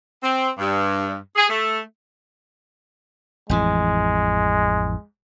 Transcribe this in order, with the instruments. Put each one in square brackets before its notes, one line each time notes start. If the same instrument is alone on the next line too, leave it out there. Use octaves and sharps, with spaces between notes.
[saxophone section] C4
G2
G#4
A3
[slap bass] A1 F2 E3 [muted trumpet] G#3